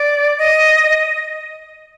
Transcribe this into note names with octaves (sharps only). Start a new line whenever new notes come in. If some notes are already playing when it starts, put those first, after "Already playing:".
Already playing: D5
D#5